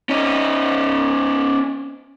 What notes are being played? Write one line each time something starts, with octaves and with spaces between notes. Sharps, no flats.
C#4 D#4